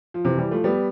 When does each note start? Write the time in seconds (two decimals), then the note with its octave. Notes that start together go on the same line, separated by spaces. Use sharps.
0.14 F3
0.24 C3 E3
0.38 E3 G3
0.51 F3 A3
0.64 G3 B3